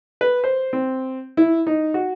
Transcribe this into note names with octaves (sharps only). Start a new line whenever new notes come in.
B4
C5
C4
E4
D#4
F#4